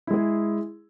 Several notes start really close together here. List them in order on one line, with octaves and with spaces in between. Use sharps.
E4 G#3 G#4